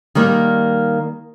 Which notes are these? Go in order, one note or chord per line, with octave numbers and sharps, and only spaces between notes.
D#3 G3 A#3